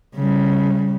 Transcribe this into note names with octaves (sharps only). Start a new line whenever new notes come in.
C#3 G3